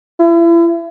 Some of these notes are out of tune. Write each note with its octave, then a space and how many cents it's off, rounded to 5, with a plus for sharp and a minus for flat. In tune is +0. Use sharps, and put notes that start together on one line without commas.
E4 +35